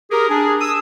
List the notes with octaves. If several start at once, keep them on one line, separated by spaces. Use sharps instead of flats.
G4 G#4 A#4
D4 G#4
D#6 E6